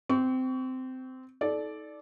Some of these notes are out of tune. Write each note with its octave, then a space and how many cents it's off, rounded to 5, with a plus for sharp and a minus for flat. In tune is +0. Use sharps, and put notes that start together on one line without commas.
C4 -20 C#6 +30
D#4 +30 A4 -25 D5 +0